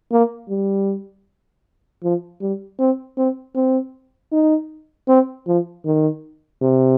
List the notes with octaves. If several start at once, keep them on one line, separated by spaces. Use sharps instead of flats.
A#3
G3
F3
G3
C4
C4
C4
D#4
C4
F3
D#3
C3